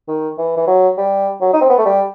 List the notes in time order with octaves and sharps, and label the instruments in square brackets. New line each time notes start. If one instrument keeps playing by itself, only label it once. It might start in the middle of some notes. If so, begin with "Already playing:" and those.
[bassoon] D#3
E3
E3
F#3
G3
F#3
D#4
C4
B3
A3
G3